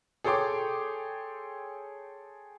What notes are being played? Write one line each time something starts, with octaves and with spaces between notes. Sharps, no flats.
G#4 A4 C#5 G5 C6 D6